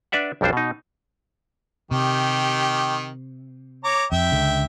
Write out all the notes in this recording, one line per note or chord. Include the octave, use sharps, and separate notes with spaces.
D4 B4 D5 E5 F#5
B1 F2 G3 D4 C5
B2 D#4
C3 D#3 G4
C#5 A#5 D6
F2 E5 G5
C#2 D3